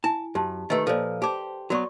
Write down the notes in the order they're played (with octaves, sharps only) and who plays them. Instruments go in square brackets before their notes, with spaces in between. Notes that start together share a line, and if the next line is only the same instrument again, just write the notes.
[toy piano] E4 G#5 [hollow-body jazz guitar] A5
[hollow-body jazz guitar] F#2 [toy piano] G4 A5
[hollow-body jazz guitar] D#3 A3 [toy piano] G4 B4 D#5
[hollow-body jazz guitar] A#2 F3 [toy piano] A4 C5 D5
[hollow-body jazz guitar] G4 C5 [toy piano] A5 D6
[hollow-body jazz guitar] F#3 B3 [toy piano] F#4 D5 C#6